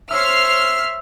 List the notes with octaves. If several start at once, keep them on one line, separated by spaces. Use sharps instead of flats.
C5 C#5 E5 E6 F6 C7